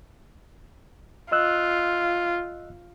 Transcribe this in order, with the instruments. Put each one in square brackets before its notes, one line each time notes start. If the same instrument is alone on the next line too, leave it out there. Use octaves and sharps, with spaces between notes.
[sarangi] F4 [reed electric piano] D#5 E6 F#6